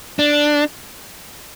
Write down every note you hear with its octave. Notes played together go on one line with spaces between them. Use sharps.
D4